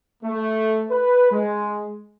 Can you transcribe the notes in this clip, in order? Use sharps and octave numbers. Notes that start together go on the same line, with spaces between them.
A3
B4
G#3